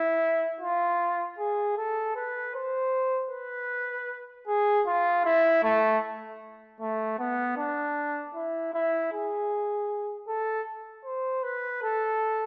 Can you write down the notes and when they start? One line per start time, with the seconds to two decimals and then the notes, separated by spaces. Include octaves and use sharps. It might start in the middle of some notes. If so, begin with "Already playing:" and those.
Already playing: E4
0.61 F4
1.38 G#4
1.77 A4
2.15 B4
2.55 C5
3.31 B4
4.47 G#4
4.87 F4
5.25 E4
5.63 A3
6.80 A3
7.19 B3
7.57 D4
8.35 E4
8.74 E4
9.12 G#4
10.28 A4
11.05 C5
11.44 B4
11.83 A4